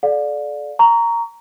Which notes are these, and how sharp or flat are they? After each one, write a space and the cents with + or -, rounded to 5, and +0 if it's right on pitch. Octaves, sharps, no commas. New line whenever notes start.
A4 -40 D5 +0 F5 +35
A#5 -5 C#6 +25